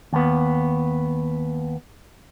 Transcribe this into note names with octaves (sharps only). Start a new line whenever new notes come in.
D#2 B3